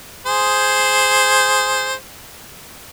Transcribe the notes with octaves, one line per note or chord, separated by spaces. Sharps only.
G#4 C5